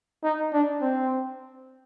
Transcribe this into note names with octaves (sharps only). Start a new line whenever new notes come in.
D#4
D4
C4